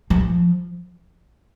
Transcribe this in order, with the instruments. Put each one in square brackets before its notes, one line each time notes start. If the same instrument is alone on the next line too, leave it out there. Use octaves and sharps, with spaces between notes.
[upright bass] F3